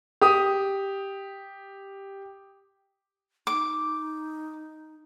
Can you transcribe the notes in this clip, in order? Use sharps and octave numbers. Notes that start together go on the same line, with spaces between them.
G4 D#6
D#4 D6